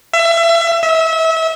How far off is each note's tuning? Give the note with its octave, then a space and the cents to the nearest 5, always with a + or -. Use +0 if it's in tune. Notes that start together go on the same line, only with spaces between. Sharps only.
E5 +30
E5 -30